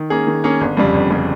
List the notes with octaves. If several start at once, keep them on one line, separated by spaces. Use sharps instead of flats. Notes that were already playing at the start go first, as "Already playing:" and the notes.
Already playing: D#3
A#3 C#4 G#4
D#3
A#3 C#4 G#4
G1
F2 C#3 G3
G1
F2 C#3 G3